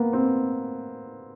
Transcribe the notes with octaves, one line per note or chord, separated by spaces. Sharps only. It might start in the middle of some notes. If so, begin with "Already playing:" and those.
Already playing: A#3 B3
C4